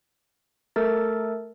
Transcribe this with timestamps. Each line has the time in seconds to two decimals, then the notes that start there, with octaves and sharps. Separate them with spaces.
0.76 A3 A4 A#4 A6